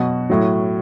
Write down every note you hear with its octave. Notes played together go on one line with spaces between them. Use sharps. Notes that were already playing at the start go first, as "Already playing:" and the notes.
Already playing: B2 F#3 F#4
A2 F#3